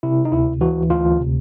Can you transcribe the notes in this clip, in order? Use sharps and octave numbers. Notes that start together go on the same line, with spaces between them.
C3 E4
D#4
D2 E4
E3 F#4
D2 F4
C3